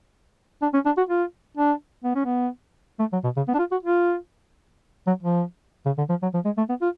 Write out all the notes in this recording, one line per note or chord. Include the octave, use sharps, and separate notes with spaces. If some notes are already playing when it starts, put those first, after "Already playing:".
D4
C#4
D4
F#4
F4
D4
B3
C#4
B3
A3
F#3
B2
C#3
B3
D4
F4
F#4
F4
F#3
F3
C#3
D3
F3
F#3
F3
G#3
A3
B3
F4